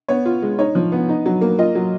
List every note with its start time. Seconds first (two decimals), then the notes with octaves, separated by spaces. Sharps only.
0.08 B3 C#5
0.26 F4
0.42 G#3
0.59 D#4 C#5
0.75 F3
0.92 B3
1.09 D#4
1.26 F#3
1.41 A#3
1.59 F4 D#5
1.75 F#3